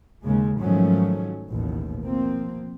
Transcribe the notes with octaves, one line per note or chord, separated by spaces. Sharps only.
D#2 C#3 G#3
G#2 D#3 F3 F#3 A3 C#4
A1 D#2 B2
F3 A#3 C4